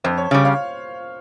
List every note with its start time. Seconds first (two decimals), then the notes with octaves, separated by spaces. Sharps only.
0.04 F2 C5
0.17 C#5
0.31 C#3 G3 C#5
0.44 C#5 F5